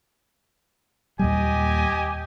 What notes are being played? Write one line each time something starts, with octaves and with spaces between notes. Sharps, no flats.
D#2 A#2 G3 G4 D#5 G#5